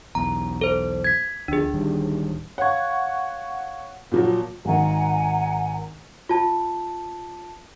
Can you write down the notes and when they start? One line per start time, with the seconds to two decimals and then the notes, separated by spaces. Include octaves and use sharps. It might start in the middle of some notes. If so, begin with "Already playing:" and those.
0.15 B1 E2 A#5
0.61 A4 C5
1.04 G#6 B6
1.48 D2 F3 D4 G#4
1.73 D1 D#3 G3
2.58 C#5 F5 F#5 C#6 G#6
4.12 A#2 F3 F#3
4.65 G#1 D#3 F#5 G#5 A#5
6.29 F4 A5